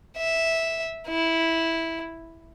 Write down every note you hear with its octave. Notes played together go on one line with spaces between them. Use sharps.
E5
E4